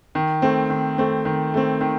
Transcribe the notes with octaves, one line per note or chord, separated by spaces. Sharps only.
D#3
A3 C4
D#3
A3 C4
D#3
A3 C4
D#3